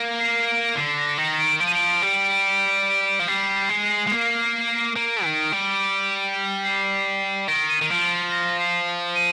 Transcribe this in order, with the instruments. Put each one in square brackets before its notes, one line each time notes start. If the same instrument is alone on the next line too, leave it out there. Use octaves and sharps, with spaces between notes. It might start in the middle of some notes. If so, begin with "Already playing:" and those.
Already playing: [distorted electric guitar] A#3
[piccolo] C7
D7
[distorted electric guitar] D3 [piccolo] C7
[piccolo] C7
A#6
[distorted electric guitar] D#3 [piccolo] A#6
[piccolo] D7
[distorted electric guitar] F3 [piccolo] D7
[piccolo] D#7
D7
[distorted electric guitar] G3
F3
[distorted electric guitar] G3 [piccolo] C7
[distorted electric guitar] G#3
G#3
A#3
[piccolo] C7
[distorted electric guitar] A#3 [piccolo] D7
[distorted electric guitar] D#3
G3
[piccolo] C7
[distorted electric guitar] D#3 [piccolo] D7
[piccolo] D#7
[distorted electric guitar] D#3
[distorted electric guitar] F3 [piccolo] D7
[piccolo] A#6
C7
D#7